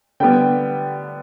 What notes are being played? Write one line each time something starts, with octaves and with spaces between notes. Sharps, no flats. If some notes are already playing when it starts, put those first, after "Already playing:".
D3 G3 B3 G5